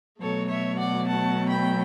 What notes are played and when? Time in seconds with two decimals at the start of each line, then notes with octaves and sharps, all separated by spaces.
0.21 B2 F#3 A3 A4 C#5
0.49 C#5 E5
0.78 D5 F#5
1.07 F#5 A5
1.49 G5 B5